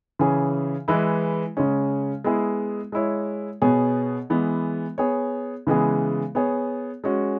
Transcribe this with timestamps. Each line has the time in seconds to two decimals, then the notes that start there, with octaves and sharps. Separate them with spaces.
0.19 C#3 E3 C#4 G#4
0.88 E3 G#3 E4 B4
1.57 C#3 G#3 C#4
2.24 G#3 B3 E4 G#4
2.92 G#3 E4 C#5
3.62 B2 B3 G#4 C#5
4.30 E3 G#3 B3
4.98 B3 G#4 C#5
5.67 C#3 E3 G#3 B3 G#4
6.35 B3 G#4 C#5
7.04 G#3 C#4 F#4